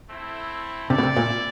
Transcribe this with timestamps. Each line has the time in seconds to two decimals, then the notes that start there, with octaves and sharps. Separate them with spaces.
0.08 A3 C4 E4 A4
0.89 C3 E4 A4 D5
0.98 B2
1.03 C3
1.16 A#2